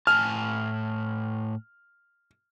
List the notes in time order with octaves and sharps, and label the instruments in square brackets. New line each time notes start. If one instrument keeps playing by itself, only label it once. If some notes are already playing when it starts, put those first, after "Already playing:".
[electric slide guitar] A2 G#5 A5 [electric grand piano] F6